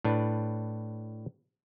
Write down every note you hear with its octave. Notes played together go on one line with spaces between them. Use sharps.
A2 D4 B4